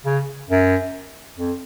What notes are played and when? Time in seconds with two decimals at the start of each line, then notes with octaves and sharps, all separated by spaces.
0.05 C#3
0.49 F#2
1.39 F2